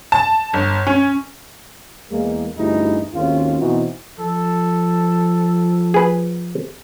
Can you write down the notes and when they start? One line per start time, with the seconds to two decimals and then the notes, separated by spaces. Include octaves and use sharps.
0.12 A5
0.53 G1
0.87 C#4
2.11 E2 G#3 A#3
2.57 A1 D2 G2 D#4 E4 G#4
3.13 G#1 D#2 C#4 F4
3.60 B2 E3 B3 C4 D#4 F#4
4.20 F3 A4
5.94 G#4 B4